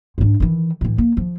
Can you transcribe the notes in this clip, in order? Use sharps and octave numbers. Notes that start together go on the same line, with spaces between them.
G#2 D4
D#3 E3
A2 E3
A#3
F3